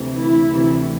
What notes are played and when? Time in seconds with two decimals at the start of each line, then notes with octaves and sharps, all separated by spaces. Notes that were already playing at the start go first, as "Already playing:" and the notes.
Already playing: D2 C3 E3
0.18 E4
0.48 D2 C3 E3